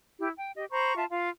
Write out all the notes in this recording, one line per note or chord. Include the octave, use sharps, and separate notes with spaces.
E4 G4
G5
G4 D#5
C5 A#5 B5 C#6
F4 E5 A5
F4 F5